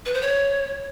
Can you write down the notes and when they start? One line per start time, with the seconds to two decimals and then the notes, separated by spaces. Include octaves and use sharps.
0.05 B4
0.14 C5
0.22 C#5